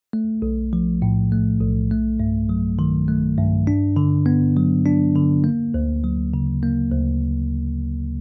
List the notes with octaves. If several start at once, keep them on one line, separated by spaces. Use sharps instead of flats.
A3
B1
F3
A2
A3
B1
A3
G2
F#3
D#3
A3
G2
D4
D3
B3
F#3
D4
D3
A#3
D2
F#3
C#3
A#3
D2